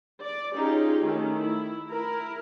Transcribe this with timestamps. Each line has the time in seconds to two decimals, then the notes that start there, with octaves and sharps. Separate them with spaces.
0.21 D5
0.54 C#4 D#4 F4 G4 G#4
1.05 D#3 A3 C#4
1.37 E4
1.90 E4 A#4